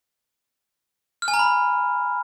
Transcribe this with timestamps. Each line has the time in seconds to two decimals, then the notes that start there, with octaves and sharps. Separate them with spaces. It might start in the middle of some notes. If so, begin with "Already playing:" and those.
1.22 F6
1.28 G#5
1.34 A#5
1.39 B5